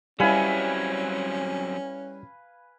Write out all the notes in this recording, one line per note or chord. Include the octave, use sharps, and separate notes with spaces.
F#3 G3 C4 C#4 E4 B4 F5 G#5